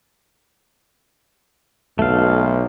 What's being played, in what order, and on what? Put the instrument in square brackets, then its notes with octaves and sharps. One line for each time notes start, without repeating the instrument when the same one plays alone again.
[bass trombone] B1 [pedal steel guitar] A3 F5